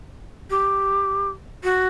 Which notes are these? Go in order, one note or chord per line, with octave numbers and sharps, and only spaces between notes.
G4
F#4